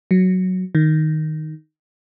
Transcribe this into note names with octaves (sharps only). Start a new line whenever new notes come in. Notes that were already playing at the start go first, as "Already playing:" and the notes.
F#3
D#3